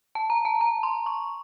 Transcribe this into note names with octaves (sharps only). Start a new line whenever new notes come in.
A5
A#5
A5
A#5
C6
C#6